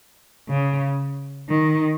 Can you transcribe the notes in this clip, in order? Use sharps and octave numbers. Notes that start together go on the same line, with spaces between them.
C#3
D#3